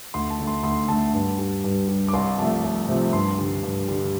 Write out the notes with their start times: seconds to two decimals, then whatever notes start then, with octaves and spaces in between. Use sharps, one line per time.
0.14 D2 C6
0.30 A5
0.39 D3 A3
0.47 C6
0.63 D2 C6
0.88 D3 A3 A5
1.13 G2
1.39 G3
1.64 G2
1.89 G3
2.08 D6
2.13 C2 C6
2.38 C3 F3 A3 A5
2.64 C2
2.88 C3 F3 A3
3.13 G2 C6
3.39 D3 G3
3.63 G2
3.88 D3 G3